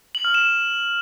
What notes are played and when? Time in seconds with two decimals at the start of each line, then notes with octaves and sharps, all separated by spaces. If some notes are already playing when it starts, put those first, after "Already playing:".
0.15 F#7
0.25 F6
0.34 E7